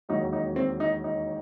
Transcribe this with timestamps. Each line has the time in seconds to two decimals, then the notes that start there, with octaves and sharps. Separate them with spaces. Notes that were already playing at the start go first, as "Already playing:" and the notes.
0.09 E1 D#2 D#3 F#3 D#4
0.33 D#4
0.56 C4
0.80 D#4
1.04 D#4